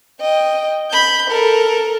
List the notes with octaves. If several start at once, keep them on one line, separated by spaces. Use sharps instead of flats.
D#5 G5
B5 G6
A4 A#4